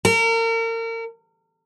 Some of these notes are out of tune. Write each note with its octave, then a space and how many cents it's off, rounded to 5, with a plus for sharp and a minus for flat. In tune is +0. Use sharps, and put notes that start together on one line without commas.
A#4 -35